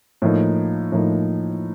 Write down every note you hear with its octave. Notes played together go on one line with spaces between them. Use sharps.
A2 F3 A#3 D#4
A2 F3 A#3 D#4